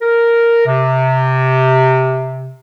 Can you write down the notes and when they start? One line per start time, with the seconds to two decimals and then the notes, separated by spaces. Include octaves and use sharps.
0.01 A#4
0.67 C3